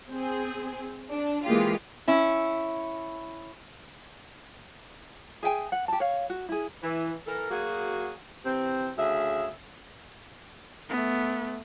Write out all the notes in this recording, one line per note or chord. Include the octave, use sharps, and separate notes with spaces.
C4 G#4
D4
E3 G#3 A#3 F4 G4
C#4 E4
G#4 E5 G5 G#5
F#5
G4 A5
C#5 F5
F#4
E4 G#4
E3
E3 A4 A#4
F#3 A#3 F#4 G#4
C3 E3 C4
D2 C#3 G#4 E5
A3 B3